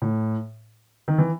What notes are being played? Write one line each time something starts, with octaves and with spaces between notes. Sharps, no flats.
A2
D#3
E3